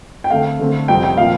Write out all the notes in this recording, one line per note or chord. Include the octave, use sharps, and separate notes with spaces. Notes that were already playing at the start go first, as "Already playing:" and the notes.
G5
D3 A3 C4 F5
D3 A3 C4
F2 C3 G3 C4 G5
G5
A#2 F3 C4 F5